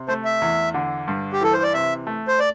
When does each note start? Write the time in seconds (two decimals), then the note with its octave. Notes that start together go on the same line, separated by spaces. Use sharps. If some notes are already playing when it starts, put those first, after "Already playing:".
Already playing: C3
0.08 A3 C5
0.25 E5
0.42 E2
0.74 D3
1.08 G2
1.33 G4
1.41 E3 A4
1.53 C5
1.63 D5
1.74 C3 E5
2.07 A3
2.28 C5
2.39 D5